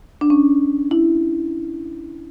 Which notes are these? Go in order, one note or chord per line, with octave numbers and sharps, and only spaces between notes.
D4
C#4
E4